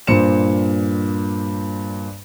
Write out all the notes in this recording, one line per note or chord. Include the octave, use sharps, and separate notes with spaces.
G2 A#2 C5 C#7 E7